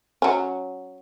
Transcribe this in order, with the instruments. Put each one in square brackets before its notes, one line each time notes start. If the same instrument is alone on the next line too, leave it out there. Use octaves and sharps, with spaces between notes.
[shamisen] F#3 C#4